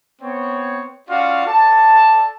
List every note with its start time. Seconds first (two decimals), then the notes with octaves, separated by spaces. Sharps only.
0.22 B3 C4 C#5
1.09 C#4 F4 F#4 D5 F5
1.46 A4 D5 A5